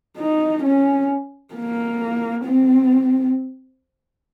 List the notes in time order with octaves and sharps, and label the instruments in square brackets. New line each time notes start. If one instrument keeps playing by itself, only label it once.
[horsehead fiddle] D#4
C#4
A#3
C4